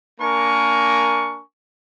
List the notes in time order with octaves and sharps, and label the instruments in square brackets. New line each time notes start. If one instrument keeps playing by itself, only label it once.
[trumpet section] A#3 D4 A#4 G#5 C#6